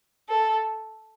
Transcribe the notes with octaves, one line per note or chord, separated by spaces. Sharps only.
A4